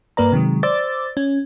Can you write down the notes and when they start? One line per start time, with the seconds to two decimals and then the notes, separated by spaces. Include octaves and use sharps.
0.17 G2 A#3 B4 D5 A#5
0.32 C3 D#3 F#3 G#3
0.63 C5 D5 D6 E6 A6
1.17 C#4